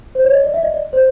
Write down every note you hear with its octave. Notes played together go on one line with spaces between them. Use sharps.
C5
C#5
D#5
D5
E5
D#5
D5
C5